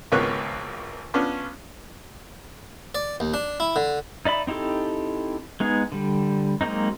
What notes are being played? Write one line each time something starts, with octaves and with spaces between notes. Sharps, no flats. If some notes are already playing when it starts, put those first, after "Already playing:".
G#1 C#2 A#3 B3 C#5 F#6
B3 C#4 D4 F4
D5
D#2
D4
E4
D3
D#4 D5 E5 B5
C4 D#4 E4 G4 A4
G#3 B3 D#4 G#4
D3 G3
F#3 G#3 A#3 C4 D#4